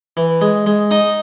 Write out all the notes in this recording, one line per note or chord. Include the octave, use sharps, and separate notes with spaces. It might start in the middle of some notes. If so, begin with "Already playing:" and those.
E3
G#3
G#3
D#4 D#5